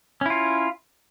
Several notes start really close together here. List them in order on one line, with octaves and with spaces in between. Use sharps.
C#4 E4 F4